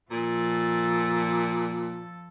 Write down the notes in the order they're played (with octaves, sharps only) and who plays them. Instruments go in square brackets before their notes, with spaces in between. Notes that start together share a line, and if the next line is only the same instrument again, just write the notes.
[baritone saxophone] A#2 [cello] F3 A4